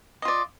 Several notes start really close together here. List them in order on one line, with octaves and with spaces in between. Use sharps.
D#5 F4 D5